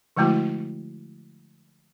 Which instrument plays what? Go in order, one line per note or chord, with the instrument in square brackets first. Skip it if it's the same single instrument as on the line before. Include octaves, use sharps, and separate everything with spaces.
[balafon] D3 F3 G#3 A3 E4 F#4